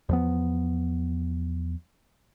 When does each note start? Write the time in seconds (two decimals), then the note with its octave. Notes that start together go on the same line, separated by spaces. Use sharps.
0.09 E2 F3 B3